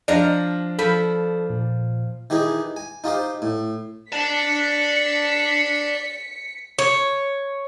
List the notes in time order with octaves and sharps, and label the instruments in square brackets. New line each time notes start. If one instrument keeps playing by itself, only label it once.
[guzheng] F3 F5 A#5 [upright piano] D4
[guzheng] F3 B5 [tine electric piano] A4
[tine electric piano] A#2
[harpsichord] D#3 E3 G4 G#4
G#5
D#4 F4 G4 C5
A2
[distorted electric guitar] D5 A5 [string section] B6 C#7
[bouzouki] C#5